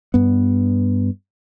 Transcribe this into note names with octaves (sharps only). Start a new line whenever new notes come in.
G2 B3